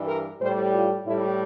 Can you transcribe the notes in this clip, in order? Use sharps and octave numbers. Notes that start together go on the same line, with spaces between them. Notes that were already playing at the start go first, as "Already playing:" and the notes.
Already playing: G2 E3 G3
A#4
A2 G3 C5
F4
A2 G3 E4